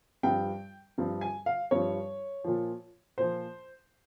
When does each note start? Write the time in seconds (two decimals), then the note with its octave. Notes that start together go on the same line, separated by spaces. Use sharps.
0.23 G2 F3 G5
0.98 G2 F3
1.21 G#5
1.46 F5
1.71 G2 F3 C#5
2.44 A#2 F3
3.18 A#2 F3 C5